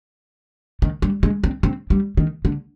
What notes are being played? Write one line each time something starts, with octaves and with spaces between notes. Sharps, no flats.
D#3
G3
G#3
C4
C4
G3
D#3
D3